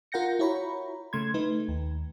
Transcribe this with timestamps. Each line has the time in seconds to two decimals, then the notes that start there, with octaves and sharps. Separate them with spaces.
0.12 F4 A#4 F#5 G6 A#6 C#7
0.39 E4 F#4 C#5 A#5 B5
1.13 C#3 A3 C6 G#6
1.34 A3 D#4 B4
1.68 D#2